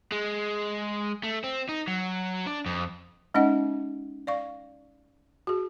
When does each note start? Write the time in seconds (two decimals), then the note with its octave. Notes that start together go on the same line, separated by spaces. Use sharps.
0.12 G#3
1.24 A3
1.44 C4
1.69 D#4
1.88 F#3
2.46 D4
2.66 F2
3.34 G#3 C#4 D#4 D#5 F#5
4.27 D5 F5 C#6
5.47 F#4 G#4